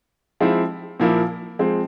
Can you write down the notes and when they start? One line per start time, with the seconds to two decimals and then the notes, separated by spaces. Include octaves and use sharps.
0.40 F3 G#3 C4 E4
1.00 A#2 F3 A#3 E4
1.59 F3 G#3 C4